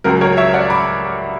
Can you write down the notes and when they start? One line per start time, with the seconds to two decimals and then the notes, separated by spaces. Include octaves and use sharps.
0.04 C#2 C#3 F#3 A#4
0.21 A#4 C#5
0.37 C#5 E5
0.54 D5 F#5
0.70 B5 D6